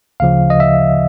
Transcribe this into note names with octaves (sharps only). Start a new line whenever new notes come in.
D2 C#3 F3 F5
D#5
E5